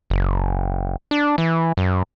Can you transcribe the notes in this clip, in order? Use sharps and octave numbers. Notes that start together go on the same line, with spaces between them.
F#1
D4
E3
F#2